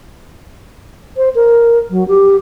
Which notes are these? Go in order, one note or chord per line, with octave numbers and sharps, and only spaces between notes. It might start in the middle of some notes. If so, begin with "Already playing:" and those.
C5
A#4
F#3
G4